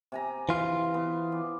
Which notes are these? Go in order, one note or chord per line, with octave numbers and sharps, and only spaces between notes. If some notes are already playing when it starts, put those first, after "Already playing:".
C3 G#5 A#5
E3 F4
B3
D5